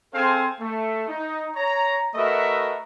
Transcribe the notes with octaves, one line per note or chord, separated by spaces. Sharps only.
C4 G#4 A4 C5 F5 G#5
A3
D#4
C#5 A#5
A3 F#4 A#4 B4 D#5 E5